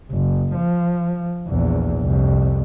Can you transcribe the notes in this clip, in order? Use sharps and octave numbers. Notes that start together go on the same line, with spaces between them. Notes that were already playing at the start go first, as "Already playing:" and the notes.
F#1
F3
A#1 E2
C2 F2